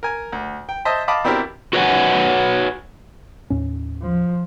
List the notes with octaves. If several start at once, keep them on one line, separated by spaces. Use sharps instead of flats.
A#4 G#5
D2
G5
C5 D#5 E5 A5
D#5 F5 A5 B5 D6 D#6
B2 C4 D4 E4 G4 A#4
F#4 B4 C#5 D#5 F#5 G#5
D#2 A2 C#4
F3